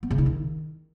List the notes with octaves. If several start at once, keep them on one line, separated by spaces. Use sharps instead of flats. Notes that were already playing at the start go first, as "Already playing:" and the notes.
B3
C#3
E4
D#3